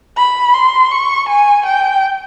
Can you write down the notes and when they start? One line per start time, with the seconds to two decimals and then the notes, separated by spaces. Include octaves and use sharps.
0.17 B5
0.54 C6
0.91 C#6
1.29 G#5
1.66 G5